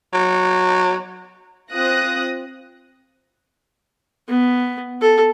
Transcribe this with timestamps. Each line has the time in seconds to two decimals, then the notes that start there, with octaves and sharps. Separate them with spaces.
0.13 F#3
1.71 C4 F4 D#6 F#6 A#6
4.29 B3
5.02 A4